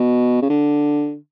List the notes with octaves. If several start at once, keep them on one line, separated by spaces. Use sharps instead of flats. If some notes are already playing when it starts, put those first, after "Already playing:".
Already playing: B2
C#3
D3